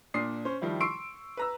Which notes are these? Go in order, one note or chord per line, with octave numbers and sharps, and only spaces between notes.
A#2 D4 D#6 C7
C#4 C5
D#3 F3 G3 E4
C6 C#6 E6 C7 D7
B4 A#5 E6